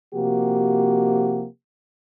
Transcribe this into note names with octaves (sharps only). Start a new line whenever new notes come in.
C3 F3 A#3 F#4 G4